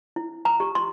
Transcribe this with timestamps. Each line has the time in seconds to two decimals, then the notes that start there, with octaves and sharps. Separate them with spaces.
0.16 E4
0.45 A#5
0.60 G4
0.75 C6